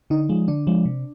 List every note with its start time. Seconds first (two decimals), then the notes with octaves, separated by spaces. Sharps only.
0.10 D3 D#4
0.29 F3 G#3
0.48 D3 D4
0.67 F3 G#3
0.85 C3